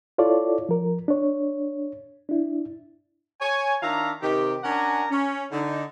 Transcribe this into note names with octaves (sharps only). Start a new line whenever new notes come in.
E4 F4 A4 C#5 D5
F3 A#4
D4 C#5
D4 E4
C#5 G#5
D#3 D4 E5 F5 A#5
C3 D#3 G4
C#4 D4 A#4 F#5 G#5 A#5
C#4
D3 D#4